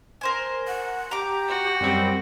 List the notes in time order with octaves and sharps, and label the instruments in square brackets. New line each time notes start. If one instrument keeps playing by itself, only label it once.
[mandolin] A#4 C5 G#5
[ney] F#5
[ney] G4 [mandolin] A#5 D6
[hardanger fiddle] F#4
[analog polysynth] F#2 G3 C4